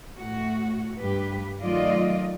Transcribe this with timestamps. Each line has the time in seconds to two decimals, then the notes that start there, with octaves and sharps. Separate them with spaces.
0.18 A2 F#4
0.98 G2 G4 B4
1.62 D#3 F#3 A3 F4 D5 D#5